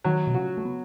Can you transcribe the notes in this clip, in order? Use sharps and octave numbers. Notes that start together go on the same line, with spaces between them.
D#3 F#3
B2
C#3 F#4
A3
B3